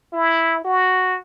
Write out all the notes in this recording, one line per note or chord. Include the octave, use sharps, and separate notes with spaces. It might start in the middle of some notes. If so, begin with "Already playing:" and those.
E4
F#4